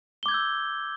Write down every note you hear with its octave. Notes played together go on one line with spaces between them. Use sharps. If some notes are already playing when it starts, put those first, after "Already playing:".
D6 E6 G6 G#6 G7